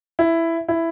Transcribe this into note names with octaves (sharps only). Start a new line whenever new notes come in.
E4
E4